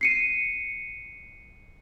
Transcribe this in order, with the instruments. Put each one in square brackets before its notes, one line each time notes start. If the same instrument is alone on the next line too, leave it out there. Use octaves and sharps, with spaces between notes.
[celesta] C7 C#7 D#7